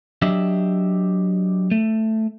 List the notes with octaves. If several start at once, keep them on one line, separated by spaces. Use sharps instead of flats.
F#3 D4 G4 D#5 E5
A3